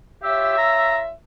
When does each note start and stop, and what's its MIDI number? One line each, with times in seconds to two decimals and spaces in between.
0.23 1.12 65
0.23 0.55 67
0.23 1.12 73
0.23 1.12 76
0.23 0.96 88
0.58 0.98 82